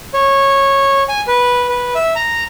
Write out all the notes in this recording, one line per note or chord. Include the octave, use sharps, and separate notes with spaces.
C#5
G#5
B4
B4
E5
A#5